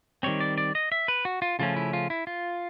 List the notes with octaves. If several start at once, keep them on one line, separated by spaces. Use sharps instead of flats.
D#3 G3 C4 C#5
D5
D5
D#5
E5
B4
F#4
F4
C#3 F3 A3 C#4 F4
E4
F4
E4
F4